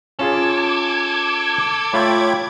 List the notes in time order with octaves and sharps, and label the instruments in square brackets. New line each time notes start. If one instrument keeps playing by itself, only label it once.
[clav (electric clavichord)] C#4 F4 G#4 [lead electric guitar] A4 [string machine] D6 G#6
[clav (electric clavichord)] A3 F4 [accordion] C#5 G5 B5